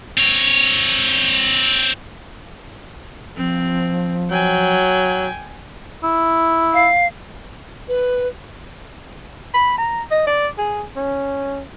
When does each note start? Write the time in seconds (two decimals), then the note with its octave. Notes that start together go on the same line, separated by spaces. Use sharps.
0.18 C4 C#5
3.37 F3 C4
4.31 F#3 G5 G#5
6.03 E4
6.73 F5
7.88 B4
9.54 B5
9.78 A#5
10.11 D#5
10.27 D5
10.58 G#4
10.96 C#4